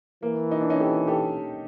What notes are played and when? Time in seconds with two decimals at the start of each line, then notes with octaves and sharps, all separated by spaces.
0.23 E3 A#3
0.51 D#4
0.61 D4
0.70 C#4 D#4
0.80 G4 A4
1.07 G4 A4